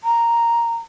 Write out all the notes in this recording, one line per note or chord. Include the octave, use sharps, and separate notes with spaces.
A#5